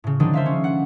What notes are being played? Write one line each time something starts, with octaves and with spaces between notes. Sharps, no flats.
A2 C#3
D3 D#3 F3 G#3 D4 D#4
C5 E5 F5
C#4
F#5